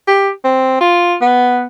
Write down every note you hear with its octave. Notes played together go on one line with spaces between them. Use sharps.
G4
C4
F4
B3